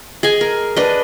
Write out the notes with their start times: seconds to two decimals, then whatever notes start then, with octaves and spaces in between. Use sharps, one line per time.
0.23 G#4 D#5 G#5
0.41 A#4
0.76 D4 B4 D#5